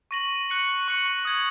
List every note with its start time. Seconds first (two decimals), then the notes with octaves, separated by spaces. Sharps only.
0.11 C#6 A#6 D#7 F#7
0.49 F#6 C#7 F#7
0.88 C#6 F#6 C#7 F#7
1.25 D#6 G#6 F#7